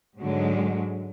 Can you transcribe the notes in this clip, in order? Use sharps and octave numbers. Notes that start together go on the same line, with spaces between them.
G#2 D3 F#3 G#3